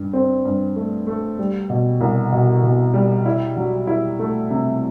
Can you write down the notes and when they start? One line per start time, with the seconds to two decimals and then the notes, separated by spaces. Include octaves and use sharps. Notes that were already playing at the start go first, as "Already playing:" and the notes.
Already playing: G2
0.13 C4
0.45 G2
0.76 A3
1.07 A3
1.39 G3
1.70 B2
2.01 C2
2.32 B2
2.63 B2
2.94 G3
3.26 E4
3.57 F#3
3.87 E4
4.19 A3
4.50 C3